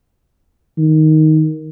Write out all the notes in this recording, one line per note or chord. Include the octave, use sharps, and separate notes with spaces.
D#3